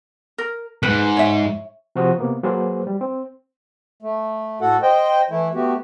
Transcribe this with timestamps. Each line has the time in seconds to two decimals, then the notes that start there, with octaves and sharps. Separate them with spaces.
0.38 A#4
0.83 F2 G#2 B4
1.17 C#5 E5
1.96 C3 F3 F#4 C5 D#6
2.18 C3 A#3 B3
2.43 F#3 A#3 G#4 B4 C5
2.87 G3
3.01 C4
4.02 A3
4.61 A2 F#4 A4 F#5
4.82 C5 D#5 G5
5.30 E3 A3 E4
5.54 A3 B3 F#4 G4